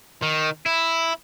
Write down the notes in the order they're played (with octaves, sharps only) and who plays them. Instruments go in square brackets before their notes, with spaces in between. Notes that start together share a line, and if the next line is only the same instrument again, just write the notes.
[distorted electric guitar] D#3
E4